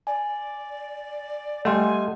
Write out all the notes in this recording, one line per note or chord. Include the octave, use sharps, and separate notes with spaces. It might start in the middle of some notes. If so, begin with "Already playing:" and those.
D5 G#5
G3 A3 D#5 F#5 G#5 C6